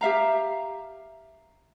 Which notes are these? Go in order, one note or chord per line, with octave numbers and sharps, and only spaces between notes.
G4 E5 F5 A#5